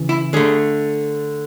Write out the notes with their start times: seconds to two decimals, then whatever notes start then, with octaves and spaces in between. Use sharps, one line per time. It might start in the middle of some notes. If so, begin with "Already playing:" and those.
Already playing: C#3 E3
0.09 E4
0.33 D3 A3 G#4